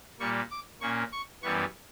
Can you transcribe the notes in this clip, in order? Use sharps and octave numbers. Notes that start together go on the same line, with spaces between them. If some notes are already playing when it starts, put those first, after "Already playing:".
A#2 G3 A#3 C#6
D6
A#2 A#3 C#4 C#6
C#6
F#2 E3 G3 B3 C#6